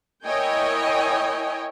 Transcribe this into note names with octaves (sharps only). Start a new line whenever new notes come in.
E4 A#4 C#5 D#5 G5 G#5